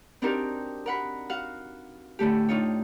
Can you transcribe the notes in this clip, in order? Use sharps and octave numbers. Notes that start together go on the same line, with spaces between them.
C4 D4 D#4 F#4 G4 A#4
A#4 F#5 B5
F#4 F5 F#5
A2 D3 A3 G4
D4 D#4 F4 C#5